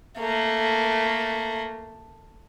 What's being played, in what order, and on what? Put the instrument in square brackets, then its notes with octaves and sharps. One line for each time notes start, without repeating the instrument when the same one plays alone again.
[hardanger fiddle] A3 A#3